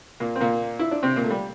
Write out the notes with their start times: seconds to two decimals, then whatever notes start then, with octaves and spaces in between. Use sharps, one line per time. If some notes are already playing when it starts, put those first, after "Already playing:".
0.20 A#2 A#3
0.36 C4
0.40 A#2 A#3
0.79 E4
0.91 D4
1.03 C3 C4
1.16 A#2 A#3
1.24 A3
1.31 G3